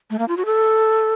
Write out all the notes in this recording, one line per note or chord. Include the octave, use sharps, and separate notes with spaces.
A3
A#3
F4
F#4
A4